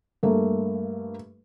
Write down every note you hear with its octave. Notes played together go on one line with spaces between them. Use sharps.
G2 A3 A#3